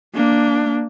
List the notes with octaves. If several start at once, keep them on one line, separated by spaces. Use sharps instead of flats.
A#3 D4